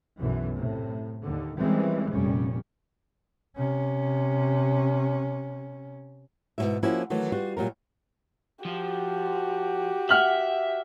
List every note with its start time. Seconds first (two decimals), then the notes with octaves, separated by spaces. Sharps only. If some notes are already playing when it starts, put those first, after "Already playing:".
0.20 B1 F#2 E3
0.56 A2 C3
1.23 D#2 D3
1.59 D#3 E3 G3 G#3 C4 C#4
2.11 F1 A#2 G3 C#4
3.57 C3 C#4
6.58 G#2 B2 F3 F#3 E4 E5
6.83 F3 A#3 C#4 E4 F#4
7.10 D#3 E3 F#3 A3
7.32 G3 F4 F#4
7.57 A#2 F#3 G3 A#4
8.65 F3 F#4 G4
10.09 E5 F#5 F6 F#7